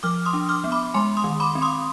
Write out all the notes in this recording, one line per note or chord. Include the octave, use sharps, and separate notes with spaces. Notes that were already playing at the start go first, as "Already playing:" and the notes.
F3 D6 F6
C6 D#6
D4
D6 F6
B3
B5 D6
G#3 G#5 C6
C6 D#6
D#3
B5 D6
C4
C6 D#6